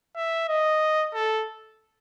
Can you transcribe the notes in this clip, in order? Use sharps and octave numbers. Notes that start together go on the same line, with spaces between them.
E5
D#5
A4